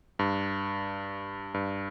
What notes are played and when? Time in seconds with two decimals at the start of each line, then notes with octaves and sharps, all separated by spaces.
0.19 G2
1.54 G2